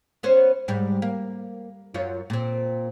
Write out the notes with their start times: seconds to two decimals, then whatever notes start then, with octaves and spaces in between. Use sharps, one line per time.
0.23 B3 C#4 C5
0.68 G#2 G3
1.02 A#3
1.94 F#2 F4 C#5
2.30 A#2 C4